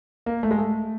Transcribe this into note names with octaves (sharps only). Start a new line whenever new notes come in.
A#3
A3
G#3
A3